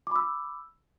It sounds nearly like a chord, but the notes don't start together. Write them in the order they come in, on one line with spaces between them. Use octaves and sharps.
D6 B5 E6